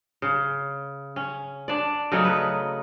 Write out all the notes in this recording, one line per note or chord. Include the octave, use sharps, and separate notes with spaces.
C#3
C#4
D4 D5
C#3 F#3 A3 D#4
B4